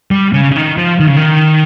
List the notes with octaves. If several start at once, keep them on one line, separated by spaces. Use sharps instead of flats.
G3
C#3
C#3
D#3
F3
D#3
C#3
D#3